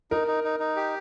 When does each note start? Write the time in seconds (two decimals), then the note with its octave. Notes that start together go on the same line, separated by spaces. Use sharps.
0.11 D#4 A#4
0.28 D#4
0.44 D#4
0.60 D#4
0.76 G4